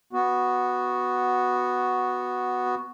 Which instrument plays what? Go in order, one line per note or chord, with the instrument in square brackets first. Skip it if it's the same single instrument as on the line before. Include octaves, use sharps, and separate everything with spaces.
[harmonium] B3 F#4